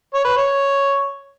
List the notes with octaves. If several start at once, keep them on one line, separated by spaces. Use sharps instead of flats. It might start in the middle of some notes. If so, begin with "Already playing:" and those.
C#5
B4
C#5